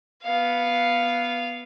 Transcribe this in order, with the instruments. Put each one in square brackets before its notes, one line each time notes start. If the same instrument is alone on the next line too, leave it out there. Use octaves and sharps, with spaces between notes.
[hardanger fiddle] B3 F5